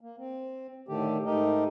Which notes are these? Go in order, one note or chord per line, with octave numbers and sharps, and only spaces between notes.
A#3
C4
A2 D3 D#3 A3 G4
G#2 A3 D#4 G4 A#4 D#5